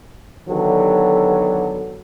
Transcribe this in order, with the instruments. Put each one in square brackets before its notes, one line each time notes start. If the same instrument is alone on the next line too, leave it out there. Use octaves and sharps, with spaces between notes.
[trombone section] D3 D#3 F#3 B3 G4 A4